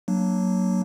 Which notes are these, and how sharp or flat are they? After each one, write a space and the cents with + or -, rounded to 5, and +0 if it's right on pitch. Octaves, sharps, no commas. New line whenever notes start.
F#3 +10 A#3 +0 D4 +0